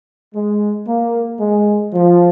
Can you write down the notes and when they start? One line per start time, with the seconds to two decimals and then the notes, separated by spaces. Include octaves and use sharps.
0.34 G#3
0.87 A#3
1.39 G#3
1.93 F3